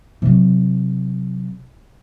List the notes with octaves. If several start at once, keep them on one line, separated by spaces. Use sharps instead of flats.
C3 F#3